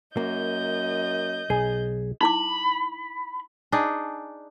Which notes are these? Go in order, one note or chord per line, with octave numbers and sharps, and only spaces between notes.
F#2 A#3 D#5 G6
B1 G#4
D#4 E4 B5 D6
D4 D#4 G#4